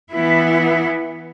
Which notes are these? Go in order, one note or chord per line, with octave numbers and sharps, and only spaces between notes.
E3 B3 E4